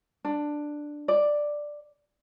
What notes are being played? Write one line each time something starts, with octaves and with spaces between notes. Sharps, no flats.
D4
D5